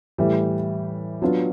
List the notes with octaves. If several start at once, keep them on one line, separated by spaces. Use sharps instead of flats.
A2 E3 G3
F#3 B3 D4 F4